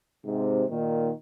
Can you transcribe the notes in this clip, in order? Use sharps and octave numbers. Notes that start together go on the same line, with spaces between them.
G#2 C3
A#2 D#3